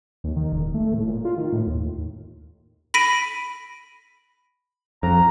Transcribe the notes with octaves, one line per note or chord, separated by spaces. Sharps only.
D#2
D#3
D#1
A3
A2
A#2
F4
D#3
A2
D#2
B5 A#6 B6 D7 D#7
F2 A#5